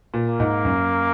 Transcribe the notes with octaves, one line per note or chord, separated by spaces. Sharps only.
A#2
A#3
G#2
F#2